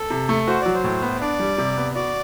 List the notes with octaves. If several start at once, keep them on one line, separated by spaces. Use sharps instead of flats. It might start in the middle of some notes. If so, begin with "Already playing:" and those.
Already playing: A4
C3
A3
F#4 C5
F#3 D5
C5
A2
B3
D4 D5
G3
C3
B3
F#4 D5